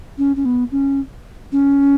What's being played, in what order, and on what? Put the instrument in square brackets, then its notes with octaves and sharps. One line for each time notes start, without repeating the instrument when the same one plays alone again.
[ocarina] C#4
C#4
B3
C#4
C#4